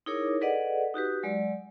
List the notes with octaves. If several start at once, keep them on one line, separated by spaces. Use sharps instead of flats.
D#4 E4 G#4 A#4 C#5 D6
G#4 A4 B4 D5 D#5 F#5
D#4 F#4 G4 B4
F#3 G#3 D5